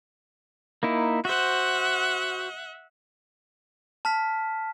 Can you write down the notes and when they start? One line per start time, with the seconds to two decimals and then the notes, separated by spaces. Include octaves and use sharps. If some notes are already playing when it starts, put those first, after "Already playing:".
0.83 A#3 D#4 E4
1.25 F#4 C5 E5 F#5
4.05 A5 F6 B6